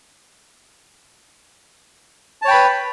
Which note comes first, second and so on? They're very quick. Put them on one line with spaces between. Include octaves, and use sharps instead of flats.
A5 C#5 G5 B5 B4